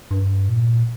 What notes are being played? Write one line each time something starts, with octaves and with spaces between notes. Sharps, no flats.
G2
A#2